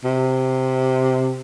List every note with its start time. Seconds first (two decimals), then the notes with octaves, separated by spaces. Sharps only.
0.04 C3